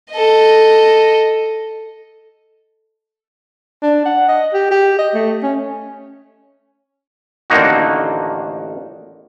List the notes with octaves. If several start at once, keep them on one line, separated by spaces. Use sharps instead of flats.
A4 D#5
D4
F#5
D#5
G4
G4
D#5
A3
C#4
A1 D3 D#3 A#3 D#4 F#4